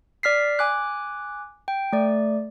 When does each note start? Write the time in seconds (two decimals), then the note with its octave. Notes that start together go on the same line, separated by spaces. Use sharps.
0.23 D5 F6 B6 C7
0.59 G#5 D6 F#6
1.68 G5
1.93 A3 D5